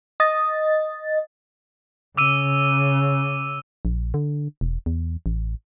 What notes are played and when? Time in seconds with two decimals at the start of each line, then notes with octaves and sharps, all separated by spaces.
0.20 D#5 A6
2.17 C#3 D6 E6 D#7
3.85 A#1
4.14 D3
4.61 E1
4.86 E2
5.26 A1